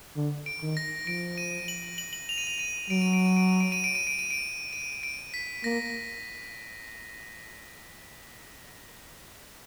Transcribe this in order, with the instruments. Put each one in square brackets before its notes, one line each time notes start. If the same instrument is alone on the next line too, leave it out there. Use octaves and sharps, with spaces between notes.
[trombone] D3
[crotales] D7
[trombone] D#3
[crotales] A#6
[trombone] F3 [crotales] D7
[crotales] D#7
F#7
F#7
F#7
F7
D#7
F7
D#7
[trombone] F#3 [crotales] D7
[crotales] D#7
D7
D#7
D7
D#7
D7
D#7
D7
D#7
D7
D#7
D7
D#7
D7
B6
[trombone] A#3 [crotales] A#6